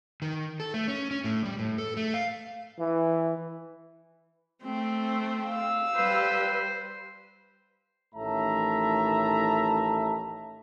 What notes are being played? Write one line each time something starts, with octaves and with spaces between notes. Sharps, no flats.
D#3
A4
A3
C#4
C#4
A2
G3
A2
A4
A3
F5
E3
A3 C4
F5 E6
G3 B4 C5
A1 A2 D#3 E5 A5 A#5